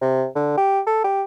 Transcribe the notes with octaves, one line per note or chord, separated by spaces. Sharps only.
C3
D3
G4
A4
G4